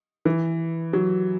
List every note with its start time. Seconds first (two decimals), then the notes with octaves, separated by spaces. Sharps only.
0.25 E3
0.93 F#3